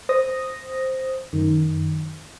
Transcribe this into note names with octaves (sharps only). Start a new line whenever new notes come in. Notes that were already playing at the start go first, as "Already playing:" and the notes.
C5 D#6 A#6
F#2 D#3